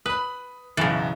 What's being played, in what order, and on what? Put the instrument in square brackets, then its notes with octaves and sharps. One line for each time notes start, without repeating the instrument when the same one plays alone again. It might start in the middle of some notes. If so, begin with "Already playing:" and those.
[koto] B4 [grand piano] B5 D#6
[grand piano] B1 F#2 A6 [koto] C#3 E3